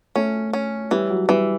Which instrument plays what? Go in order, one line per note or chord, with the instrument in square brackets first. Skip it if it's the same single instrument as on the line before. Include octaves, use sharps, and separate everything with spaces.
[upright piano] A3 [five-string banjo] C#4
[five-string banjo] C#4
[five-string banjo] E3 [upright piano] G3
[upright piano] F#3
[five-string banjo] E3 [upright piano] G3